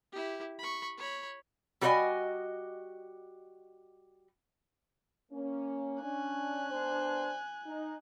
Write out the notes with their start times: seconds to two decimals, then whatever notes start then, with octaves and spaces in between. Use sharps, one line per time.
0.12 E4 G4
0.59 B5 C#6
0.98 C#5 B5
1.81 G3 F#4 A#4 C#5 D#5 G#5
5.32 A#3 C#4
6.02 C#4 D4 G#5 F#6
6.70 B3 D4 C5
7.66 D#4